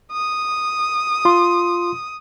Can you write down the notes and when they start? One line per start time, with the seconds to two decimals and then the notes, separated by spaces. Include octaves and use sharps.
0.12 D#6
1.25 F4 C6